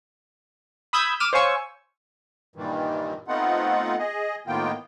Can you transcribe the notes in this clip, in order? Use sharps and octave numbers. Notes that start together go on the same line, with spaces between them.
B5 D#6 E6 G6 G#6 B6
D6 E6 F6 D#7
C5 C#5 F5 G#5 C#6 E6
G2 A#2 D#3 E3 G3
A3 B3 C4 D#4 F4 F#5
G#4 D#5
A2 D#3 A#3 B3 F4 G5